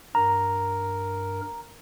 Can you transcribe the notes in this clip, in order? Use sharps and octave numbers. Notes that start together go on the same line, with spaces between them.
G2 A#4 A#5